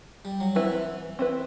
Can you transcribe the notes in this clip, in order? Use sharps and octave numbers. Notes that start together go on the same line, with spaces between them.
G3
F#3
E3 C4 E4 B4
C4 E4 B4